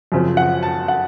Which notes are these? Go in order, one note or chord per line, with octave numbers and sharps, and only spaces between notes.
F#2 C#3 F3 C4
F#5
A5
F#5